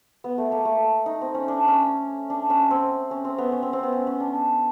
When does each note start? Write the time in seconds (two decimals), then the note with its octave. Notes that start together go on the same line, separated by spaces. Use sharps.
0.24 B3
0.38 A3
0.52 A#3
0.65 A3
1.06 D#4
1.21 C4
1.35 C#4
1.48 D4
1.68 C#4
2.30 D4
2.50 C#4
2.71 C4
3.11 C#4
3.25 C4
3.38 B3
3.52 C#4
3.63 C4
3.73 C4
3.83 B3
3.93 C#4
4.07 C#4
4.20 D4